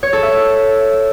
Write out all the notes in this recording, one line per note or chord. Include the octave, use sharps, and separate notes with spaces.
C#5
A4
E5